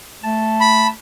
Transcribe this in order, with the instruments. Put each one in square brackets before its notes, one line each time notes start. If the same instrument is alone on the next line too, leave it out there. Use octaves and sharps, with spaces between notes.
[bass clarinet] A3 [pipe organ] A5
[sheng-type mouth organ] B5